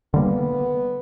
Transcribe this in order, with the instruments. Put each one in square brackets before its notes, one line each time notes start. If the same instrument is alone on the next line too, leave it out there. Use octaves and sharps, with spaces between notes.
[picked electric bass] D3 G3 A#3 [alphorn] B3